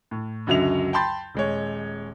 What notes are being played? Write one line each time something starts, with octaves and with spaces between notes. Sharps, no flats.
A2
C#2 F#2 D3 F#3 E5 F7
G5 A5 B5 C6 G6 A6
D#1 G#3 C#5